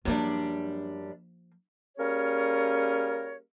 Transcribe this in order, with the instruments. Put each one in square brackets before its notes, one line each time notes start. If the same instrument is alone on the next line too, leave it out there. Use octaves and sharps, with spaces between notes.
[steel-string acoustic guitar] F#2 G3 D4 [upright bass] F3 A#3
[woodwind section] G3 A#3 C#4 G#4 A#4 C#5